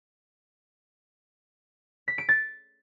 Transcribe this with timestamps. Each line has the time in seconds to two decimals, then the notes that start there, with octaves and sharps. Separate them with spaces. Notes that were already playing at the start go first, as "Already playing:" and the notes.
2.08 B6
2.18 D7
2.29 A6